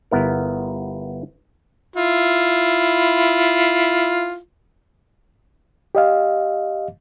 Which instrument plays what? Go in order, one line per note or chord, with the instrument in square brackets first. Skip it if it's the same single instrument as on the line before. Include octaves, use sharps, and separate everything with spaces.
[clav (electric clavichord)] G1 B3 E4 A#4
[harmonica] E4 F4
[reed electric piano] G4 D#5 F5